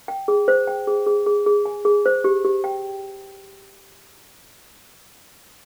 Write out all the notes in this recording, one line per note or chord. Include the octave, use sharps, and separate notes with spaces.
G5
G#4
C5
G5
G#4
G#4
G#4
G#4
G#5
G#4
C5
G4
G4
G5